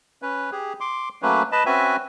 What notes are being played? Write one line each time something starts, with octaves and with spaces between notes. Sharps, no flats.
C#4 B4
G4 G#4
C6 D6
F#3 A3 A#3 C#4 B4
B4 D#5 A5 B5
C4 C#4 F#4 B4 E5 G#5